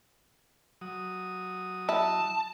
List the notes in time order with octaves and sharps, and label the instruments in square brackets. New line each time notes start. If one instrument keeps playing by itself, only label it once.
[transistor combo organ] F#3 D#6
[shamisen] E4 [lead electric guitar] A5